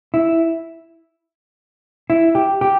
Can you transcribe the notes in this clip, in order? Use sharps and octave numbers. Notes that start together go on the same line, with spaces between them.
E4
E4
G4
G4